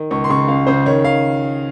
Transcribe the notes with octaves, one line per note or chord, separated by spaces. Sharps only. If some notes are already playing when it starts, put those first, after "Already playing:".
Already playing: D#3
C#2 C#6
C6
C#3 C#6
C#2 F5
C#3 C5
D#3 C#5
D#3 F5